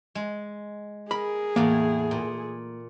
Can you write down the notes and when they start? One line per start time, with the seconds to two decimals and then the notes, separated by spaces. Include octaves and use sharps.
0.15 G#3
1.11 G#4 A#4 B5
1.56 E2 A2 A#3
2.11 A#2